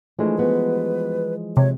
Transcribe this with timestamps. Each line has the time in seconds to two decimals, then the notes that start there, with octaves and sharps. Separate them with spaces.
0.19 E3 F3 G#3 A3 D4
0.39 G3 B3 F#4 B4
1.57 C3 C#5